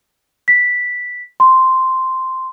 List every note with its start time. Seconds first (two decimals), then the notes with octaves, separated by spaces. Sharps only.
0.48 B6
1.40 C6